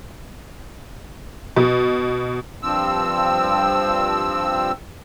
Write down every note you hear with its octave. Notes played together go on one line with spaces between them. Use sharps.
B2
G2 F3 C4 E6